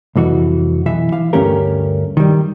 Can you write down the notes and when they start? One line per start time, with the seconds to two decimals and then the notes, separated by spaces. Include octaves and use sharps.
0.16 C2 F2 E3 F#4
0.86 B1 E3 E5
1.12 E3 F5
1.33 D2 G2 A3 C#4 G4 A#4
2.17 D#3 G3